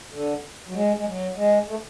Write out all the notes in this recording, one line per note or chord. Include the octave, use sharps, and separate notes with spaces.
D3
F#3
G#3
G#3
F#3
G#3
A3